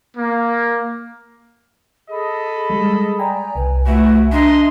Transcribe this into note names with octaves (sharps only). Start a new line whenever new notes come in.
A#3
G#4 A4 D#5 B5
G3 G#3
D5 G5 G#5 A#5
C2 B4 G#5
A3 E4 F#4 E5
D4 D#5 A#5 C6